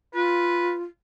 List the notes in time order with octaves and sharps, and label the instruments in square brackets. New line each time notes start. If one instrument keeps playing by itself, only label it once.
[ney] F4 [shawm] B4